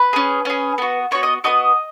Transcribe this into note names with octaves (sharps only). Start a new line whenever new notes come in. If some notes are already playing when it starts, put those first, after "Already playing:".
Already playing: B4 B5
C#4 G#4
C#4 G#4
B3 F#4
B3 F#4 C#5 C#6
D#5 D#6
B3 F#4 D#5 D#6